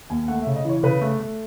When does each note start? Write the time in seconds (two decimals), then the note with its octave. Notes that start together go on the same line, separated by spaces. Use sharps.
0.10 D#2 G#5
0.28 A3 F#5
0.42 E5
0.47 C#3
0.55 D#5
0.65 E3 C#5
0.83 C#3 B4
1.01 A3
1.20 A3